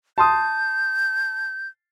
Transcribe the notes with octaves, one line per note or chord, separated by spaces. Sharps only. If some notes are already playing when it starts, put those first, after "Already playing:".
A5 C6 D#6 G6